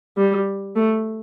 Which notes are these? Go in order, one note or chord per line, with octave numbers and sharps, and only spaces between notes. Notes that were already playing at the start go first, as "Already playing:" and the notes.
G3
A3